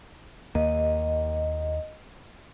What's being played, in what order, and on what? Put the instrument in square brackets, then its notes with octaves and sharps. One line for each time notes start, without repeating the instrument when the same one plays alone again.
[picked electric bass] D#2 A#3 [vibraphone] D#5